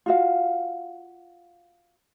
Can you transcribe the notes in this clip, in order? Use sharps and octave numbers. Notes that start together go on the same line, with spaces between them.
F4 F#4 F5